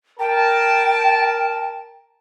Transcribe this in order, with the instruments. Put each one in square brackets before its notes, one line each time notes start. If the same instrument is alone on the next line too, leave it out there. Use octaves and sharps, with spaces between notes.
[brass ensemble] A#4 A5 [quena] G5